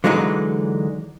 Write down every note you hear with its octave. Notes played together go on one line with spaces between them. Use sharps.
D3 E3 F#3 G#3 D4 D#4